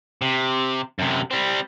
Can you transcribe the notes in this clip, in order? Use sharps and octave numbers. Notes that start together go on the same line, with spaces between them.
C3
F#2 C3
G3 C4